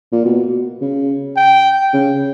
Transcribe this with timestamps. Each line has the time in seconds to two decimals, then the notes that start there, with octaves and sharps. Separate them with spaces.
0.12 A#2
0.25 B2
0.81 C#3
1.37 G5
1.94 C#3